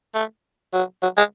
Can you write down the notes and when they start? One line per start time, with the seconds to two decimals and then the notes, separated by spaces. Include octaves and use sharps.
0.15 A3
0.73 F#3
1.03 F#3
1.17 G#3